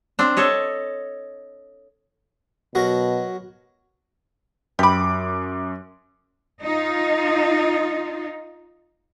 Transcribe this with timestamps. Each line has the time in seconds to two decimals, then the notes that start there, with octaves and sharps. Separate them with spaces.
0.19 C4 D4
0.37 A4 C#5 D#5
2.75 B2 F#3 F#4 A#4
4.79 F#2 G4 B5 D6
6.62 D#4 F4